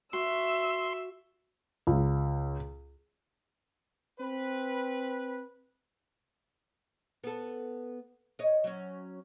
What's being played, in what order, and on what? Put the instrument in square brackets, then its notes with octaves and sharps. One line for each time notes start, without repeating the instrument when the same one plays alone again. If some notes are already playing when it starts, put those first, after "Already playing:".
[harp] F#4 [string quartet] E5 E6 [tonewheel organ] C6
[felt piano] C#2
[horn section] C4 B4
[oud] B3 A4
C#5 D#5
F#3 C#4